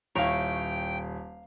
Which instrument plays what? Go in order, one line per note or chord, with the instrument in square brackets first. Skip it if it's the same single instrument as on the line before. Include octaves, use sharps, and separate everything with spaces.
[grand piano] D#1 [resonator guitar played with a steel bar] E4 C#5 [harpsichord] F5 A#5 [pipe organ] G5